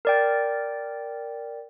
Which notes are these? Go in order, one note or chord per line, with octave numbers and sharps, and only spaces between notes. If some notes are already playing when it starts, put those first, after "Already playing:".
A#4 D5 G5